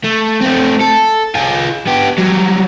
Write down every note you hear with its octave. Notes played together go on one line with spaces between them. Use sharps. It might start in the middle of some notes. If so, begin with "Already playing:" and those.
A3
A3 C4
A4
F4 G#4
B3 G4
F#3 G3